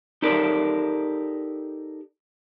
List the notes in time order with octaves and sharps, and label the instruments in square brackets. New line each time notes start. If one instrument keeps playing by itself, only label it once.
[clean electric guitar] D#4 G4 A4 A#4 D5